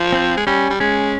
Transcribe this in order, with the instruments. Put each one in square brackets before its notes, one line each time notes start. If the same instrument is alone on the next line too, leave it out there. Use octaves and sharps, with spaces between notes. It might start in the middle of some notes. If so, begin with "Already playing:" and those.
Already playing: [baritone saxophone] F3
[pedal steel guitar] C4
[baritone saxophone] G#3
[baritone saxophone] G3 [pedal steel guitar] C#4
[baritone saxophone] G3
[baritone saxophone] G#3 [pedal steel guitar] C#4